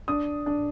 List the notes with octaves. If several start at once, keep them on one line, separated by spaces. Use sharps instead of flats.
D4 D#6
D4